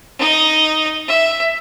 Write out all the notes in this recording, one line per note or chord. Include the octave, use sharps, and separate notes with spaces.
D#4 D#5
E5